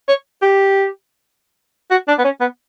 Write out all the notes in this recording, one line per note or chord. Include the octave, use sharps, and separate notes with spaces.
C#5
G4
F#4
D4
B3
C#4
B3